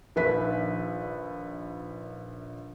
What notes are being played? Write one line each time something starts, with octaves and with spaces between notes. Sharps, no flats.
A#1 D#3 B4 E5 B6